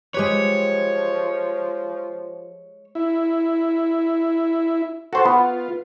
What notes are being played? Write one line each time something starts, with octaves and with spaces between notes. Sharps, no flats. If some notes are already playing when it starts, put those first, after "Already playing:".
F3 G#3 G4 B4 C#5
E4
F#4 A4 C5
B3 F4